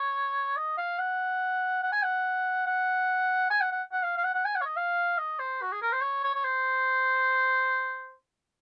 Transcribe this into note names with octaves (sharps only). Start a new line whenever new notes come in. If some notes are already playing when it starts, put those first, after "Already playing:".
Already playing: C#5
D#5
F5
F#5
F#5
G#5
F#5
F#5
G#5
F#5
F#5
F#5
F5
F5
F#5
F#5
G#5
F#5
C#5
D#5
F5
D#5
C5
F#4
G#4
A#4
C5
C#5
C#5
C#5
C5